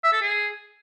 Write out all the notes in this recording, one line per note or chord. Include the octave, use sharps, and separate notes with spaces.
E5
A4
G#4